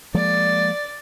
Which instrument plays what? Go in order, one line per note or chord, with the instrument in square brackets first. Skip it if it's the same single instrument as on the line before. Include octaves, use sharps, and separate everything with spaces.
[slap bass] F3 G#3 A#3 [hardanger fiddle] D5